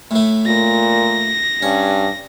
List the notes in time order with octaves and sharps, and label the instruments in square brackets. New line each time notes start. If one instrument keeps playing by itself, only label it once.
[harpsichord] A2 A3
[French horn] A#2 [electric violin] A#6
[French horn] G2 [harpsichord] C#4